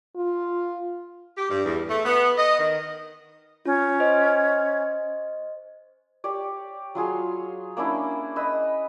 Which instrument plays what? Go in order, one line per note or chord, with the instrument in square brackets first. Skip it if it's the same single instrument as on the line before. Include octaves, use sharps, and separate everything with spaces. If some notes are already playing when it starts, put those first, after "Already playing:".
[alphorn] F4
[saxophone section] G4
G2
E2
A3
B3
D#5
D#3
[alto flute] C#4 [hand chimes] F4
[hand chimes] C5 D#5
[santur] G4 C#5 D5
F#3 F4 G#4 C#5
A#3 C#4 D4 E4
B4 D#5 D#6 E6